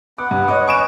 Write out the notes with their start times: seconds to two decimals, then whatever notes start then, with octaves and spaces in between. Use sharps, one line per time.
0.18 B3 F#5 D6
0.31 G2
0.48 C#5 D#5 D6
0.67 C#4 B4 D#5 C#6 D7 E7